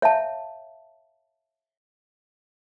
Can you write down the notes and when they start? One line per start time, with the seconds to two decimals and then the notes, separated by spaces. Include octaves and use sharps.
0.02 C#5 E5 F5 A5